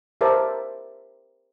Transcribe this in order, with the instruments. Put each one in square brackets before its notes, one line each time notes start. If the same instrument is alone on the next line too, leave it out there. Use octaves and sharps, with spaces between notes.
[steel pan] G4 A#4 C5 D5 E5 A5